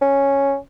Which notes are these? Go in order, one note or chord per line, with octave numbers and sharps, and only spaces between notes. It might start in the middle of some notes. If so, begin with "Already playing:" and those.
C#4